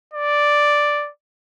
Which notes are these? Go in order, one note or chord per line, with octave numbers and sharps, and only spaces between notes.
D5